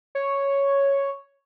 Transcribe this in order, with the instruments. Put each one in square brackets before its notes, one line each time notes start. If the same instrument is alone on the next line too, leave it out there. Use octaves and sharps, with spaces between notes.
[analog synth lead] C#5